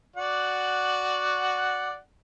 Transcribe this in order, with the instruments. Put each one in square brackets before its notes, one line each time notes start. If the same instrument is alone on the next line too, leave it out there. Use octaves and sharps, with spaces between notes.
[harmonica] F#4 D5 F#5